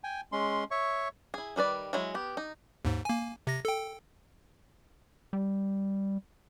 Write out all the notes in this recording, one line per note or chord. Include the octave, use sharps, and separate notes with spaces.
G5 G#5
G#3 C#4 C6
C#5 E5 C#6
E4 G#4
D#3 G3 B4 D5
F#3 G#3 E4
B3 G4
D#4
D#2 G#2
A#3 G#5
C3 A#6
A4 G5
G3